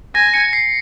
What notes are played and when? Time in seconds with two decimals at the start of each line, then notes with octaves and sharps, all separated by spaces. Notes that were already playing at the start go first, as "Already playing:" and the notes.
0.15 G#5 A#6
0.34 C#7
0.53 C7